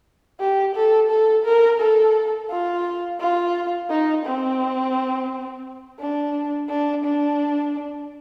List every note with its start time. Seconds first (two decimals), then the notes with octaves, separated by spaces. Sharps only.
0.40 G4
0.75 A4
1.10 A4
1.46 A#4
1.80 A4
2.50 F4
3.20 F4
3.90 D#4
4.25 C4
6.00 D4
6.69 D4
7.05 D4